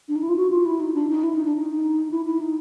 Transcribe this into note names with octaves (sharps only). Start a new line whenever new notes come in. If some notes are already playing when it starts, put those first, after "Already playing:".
D4
D#4
E4
F4
F#4
F4
E4
D#4
D4
D#4
E4
D#4
D4
D#4
E4
E4
D#4